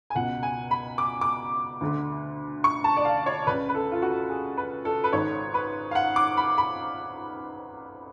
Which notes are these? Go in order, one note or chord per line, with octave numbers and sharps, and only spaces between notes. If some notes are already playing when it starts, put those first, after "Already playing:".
G#5
C#2 B2 F#5
G#5
B5
D6
D6
D2 D3
C#6
A5
D5
F5
C#5
C#2 C#3 B4
B4
A4
F4
F#4
G#4
B4
A4
B4
G#1 G#2 C#5
B4
F5
F#5
D6
B5
B5